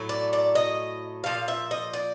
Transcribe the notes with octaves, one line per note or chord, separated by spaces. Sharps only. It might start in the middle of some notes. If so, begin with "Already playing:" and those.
Already playing: A2 F#3 A3
D5
D5
D#5
A#2 F3 F5
E5
D#5
D5